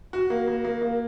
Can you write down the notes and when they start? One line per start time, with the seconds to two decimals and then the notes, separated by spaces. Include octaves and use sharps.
0.13 F#4
0.30 A#3
0.48 A#3
0.65 A#3
0.82 A#3